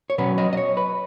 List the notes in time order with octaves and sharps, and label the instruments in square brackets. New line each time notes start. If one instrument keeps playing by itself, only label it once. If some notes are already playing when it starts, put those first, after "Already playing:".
[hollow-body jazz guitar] C#5
B2 F#3 C#4 B4
D#5
D#5
C#5
B4